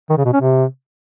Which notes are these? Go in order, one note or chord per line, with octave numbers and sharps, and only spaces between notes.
D#3
C#3
B2
C#4
C3